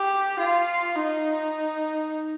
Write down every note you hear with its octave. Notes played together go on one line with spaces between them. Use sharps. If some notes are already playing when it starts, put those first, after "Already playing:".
Already playing: G4
F4
D#4